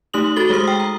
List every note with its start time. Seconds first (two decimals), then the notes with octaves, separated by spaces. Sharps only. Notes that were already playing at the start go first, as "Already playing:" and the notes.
0.14 A3 D#4 G4 D#6 F#7
0.36 F#4 A4 A6 G7
0.50 G#3 G4 G#4 C5 D#6
0.68 G5
0.80 A#5